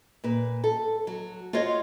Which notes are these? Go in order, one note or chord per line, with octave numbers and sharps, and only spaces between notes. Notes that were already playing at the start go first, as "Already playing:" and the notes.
A#2 B4
A4
F#3
F4 F#4 C5 C#5 D#5